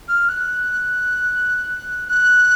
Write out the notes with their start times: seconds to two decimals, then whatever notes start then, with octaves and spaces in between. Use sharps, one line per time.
0.08 F6
0.29 F#6
2.08 F#6